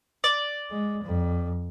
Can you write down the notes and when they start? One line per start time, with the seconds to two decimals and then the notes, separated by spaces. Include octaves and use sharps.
0.24 D5
0.70 G#3
1.03 F2